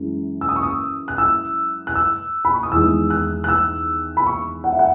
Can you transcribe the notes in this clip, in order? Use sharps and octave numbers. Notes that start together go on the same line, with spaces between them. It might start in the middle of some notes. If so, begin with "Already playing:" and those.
Already playing: F#2 E3 G#3
E6
D#6
C#6
D#6
F#6
E6
F#6
E6
B5
C#6
D#6
E2 D#3 G#3 E6
F#6
F#6
E6
B5
C#6
F#5
E5
F#5